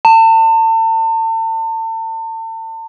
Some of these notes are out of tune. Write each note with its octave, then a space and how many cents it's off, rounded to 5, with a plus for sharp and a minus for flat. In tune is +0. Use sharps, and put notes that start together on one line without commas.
A5 +35